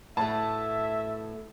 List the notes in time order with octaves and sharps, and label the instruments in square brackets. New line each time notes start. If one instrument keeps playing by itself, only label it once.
[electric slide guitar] A2 [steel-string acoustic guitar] A3 B3 F#4 [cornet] E5 [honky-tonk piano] A5